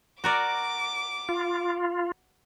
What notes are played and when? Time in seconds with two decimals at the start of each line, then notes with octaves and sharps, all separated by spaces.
0.24 F#4 A#4 D5 D6
1.29 F4